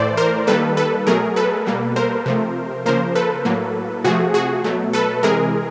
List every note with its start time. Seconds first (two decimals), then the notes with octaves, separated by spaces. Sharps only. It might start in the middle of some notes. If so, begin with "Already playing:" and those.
Already playing: A2 E3 A3 C5 D5
0.17 A#4 C5
0.47 D#3 G3 A#3 A4 B4
0.77 A4 B4
1.07 B2 F#3 A3 G#4 A#4
1.36 A4 B4
1.66 B2 G3 A#3
1.96 A#4 C5
2.26 C3 F3 A3
2.86 C#3 F3 A#3 A#4 C5
3.15 A4 B4
3.45 A2 F#3 A#3
4.04 C3 F3 A3 F#4 G#4
4.34 F#4 G#4
4.64 B2 F#3 A3
4.93 A4 B4
5.23 C3 E3 G#3 G#4 A#4